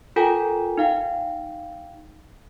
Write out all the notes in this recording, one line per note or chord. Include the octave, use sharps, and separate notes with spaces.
F4 A4 A#4 G5 G#5 A#5
D#4 F5 G5